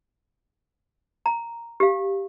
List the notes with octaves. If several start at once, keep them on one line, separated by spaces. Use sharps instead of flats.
A#5
G4 F5